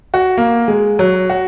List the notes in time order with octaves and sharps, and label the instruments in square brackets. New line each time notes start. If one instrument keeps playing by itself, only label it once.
[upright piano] F#4
A#3
G#3
F#3
F#4